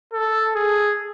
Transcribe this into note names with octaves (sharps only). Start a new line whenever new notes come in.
A4
G#4